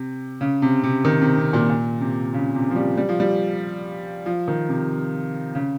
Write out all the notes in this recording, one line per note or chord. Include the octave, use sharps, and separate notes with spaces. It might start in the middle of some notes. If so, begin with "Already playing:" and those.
Already playing: C3
C#3
C3
C3
D#3
C3
C3
A#2
A#2
C3
C#3
C3
F3
G3
G3
F3
G3
F3
D#3
C3
C#3